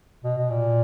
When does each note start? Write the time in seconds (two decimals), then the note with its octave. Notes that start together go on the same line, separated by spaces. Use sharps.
0.24 B2
0.38 B2
0.50 A#2